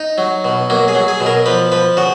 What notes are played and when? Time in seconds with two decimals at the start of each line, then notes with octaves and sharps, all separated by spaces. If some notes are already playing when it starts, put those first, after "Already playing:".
Already playing: D#4
0.18 F#3
0.44 B2
0.70 F#3 A#3
0.88 G#4
0.95 F#3
1.08 G#4
1.20 B2
1.26 A#4
1.46 F3 B4
1.72 F3 B4
1.97 C#3 F#4